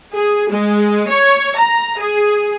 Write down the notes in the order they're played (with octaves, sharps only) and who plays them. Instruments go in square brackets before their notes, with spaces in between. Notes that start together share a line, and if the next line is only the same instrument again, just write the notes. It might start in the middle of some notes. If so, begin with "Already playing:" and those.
[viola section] G#4
G#3
C#5
A#5
G#4